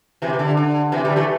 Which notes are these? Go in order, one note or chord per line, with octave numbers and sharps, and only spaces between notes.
C3 E3
C3
D3
D3
C3 E3
D3 G3
E3 A3